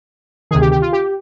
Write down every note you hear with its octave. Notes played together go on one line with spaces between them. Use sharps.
D2 C3 D#3 G#4
G4
G4
F4
G4